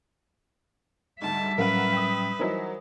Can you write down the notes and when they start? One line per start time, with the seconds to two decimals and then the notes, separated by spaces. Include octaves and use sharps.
1.22 D2 G#2 G3 E5 A5
1.58 A2 F#3 C#4 A#4 B4 F5 F#5
1.93 G5 D#6
2.39 E3 F#3 D#4 A#4 C5